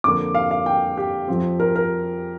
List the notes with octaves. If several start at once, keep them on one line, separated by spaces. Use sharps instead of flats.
F2 D3 A#3 D6
F5
F5
G5
G4
F2 F3 C4
A#4
A#4